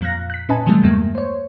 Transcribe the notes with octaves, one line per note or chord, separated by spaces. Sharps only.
F2 A#2 F3 F5 F#6 A#6
F#6 B6
A#2 C#4 B4 D#5 G#5 A5
C3 D#3 E3 F#3 G3 A3
E2 G2 C#3 G#3 A#3
C5 C#5